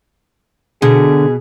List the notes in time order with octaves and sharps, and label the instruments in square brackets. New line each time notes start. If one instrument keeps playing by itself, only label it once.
[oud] B2 [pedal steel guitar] D3 [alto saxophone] G#4